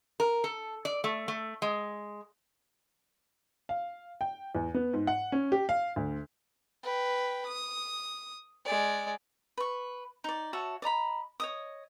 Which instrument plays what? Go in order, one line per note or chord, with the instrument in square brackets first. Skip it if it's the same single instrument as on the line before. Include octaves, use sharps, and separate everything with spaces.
[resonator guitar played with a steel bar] A#4
A4
D5
A3
A3
G#3
[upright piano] F5
G5
E2
B3
G#2
F#5
C#4
G4
F5
D2
[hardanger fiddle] B4 G5
D#6
G#3 D5
[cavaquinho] B4 C#6
D#4 D5
F#4 C#5 E5 A5
D5 D#5 A#5 B5
C#5 D#5 D#6